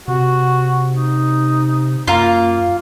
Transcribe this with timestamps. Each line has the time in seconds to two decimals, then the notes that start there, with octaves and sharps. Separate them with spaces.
0.08 C3 F#4
0.90 D#4
2.07 F#2 A#3 F4 F5 A#5